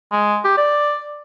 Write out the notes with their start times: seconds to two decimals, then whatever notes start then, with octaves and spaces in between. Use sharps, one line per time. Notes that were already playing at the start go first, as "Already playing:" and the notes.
0.12 G#3
0.44 G4
0.57 D5